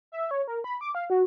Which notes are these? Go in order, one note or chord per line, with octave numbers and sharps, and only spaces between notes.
E5
C#5
A#4
B5
D6
F5
F#4